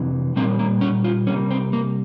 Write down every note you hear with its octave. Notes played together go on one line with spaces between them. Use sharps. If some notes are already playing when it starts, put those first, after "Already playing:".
Already playing: F2 C3 E3
A#2 G3 A#3 C4
A#3
C#4
F4
C3 G3 A#3 C#4
C4
A#3